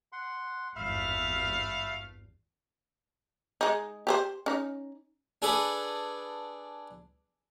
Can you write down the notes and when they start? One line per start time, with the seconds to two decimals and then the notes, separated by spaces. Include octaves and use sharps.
0.12 F#5 C6
0.76 G#1 E2 G2 A3 E5 F5 B5 F6
3.61 G#3 D#4
4.07 G4 G#4 C5
4.46 C#4 D#4
5.42 D4 G#4 A4 B4 D5